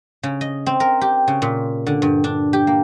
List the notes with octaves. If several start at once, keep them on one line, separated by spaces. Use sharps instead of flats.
C#3
D#5
C4
A#4
G4
C#3
A#2
D3
G2
D4
G4
A#3